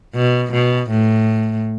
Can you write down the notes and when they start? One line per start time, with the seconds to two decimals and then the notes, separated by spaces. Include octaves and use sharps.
0.15 B2
0.53 B2
0.90 A2